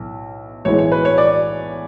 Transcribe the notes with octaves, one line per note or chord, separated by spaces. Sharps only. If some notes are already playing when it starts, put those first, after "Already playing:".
Already playing: B1 A2
B1 A2 E3 G#3 C#5
C#5
B4
C#5
D5